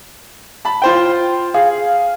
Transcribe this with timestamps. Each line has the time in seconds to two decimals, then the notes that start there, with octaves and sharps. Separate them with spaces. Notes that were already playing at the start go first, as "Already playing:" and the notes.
0.65 A5 B5
0.82 F4 C5 G5
1.54 G#4 F5